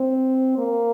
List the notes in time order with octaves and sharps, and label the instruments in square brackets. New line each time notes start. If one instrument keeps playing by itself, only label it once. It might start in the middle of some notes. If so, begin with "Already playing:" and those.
Already playing: [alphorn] C4
A#3